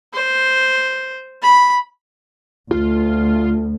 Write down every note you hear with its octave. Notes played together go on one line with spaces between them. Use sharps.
C5
B5
D2 F4